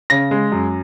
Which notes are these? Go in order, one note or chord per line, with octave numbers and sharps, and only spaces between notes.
C#3 A#6
G#3
F#2